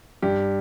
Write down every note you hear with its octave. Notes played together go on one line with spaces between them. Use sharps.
G2 G4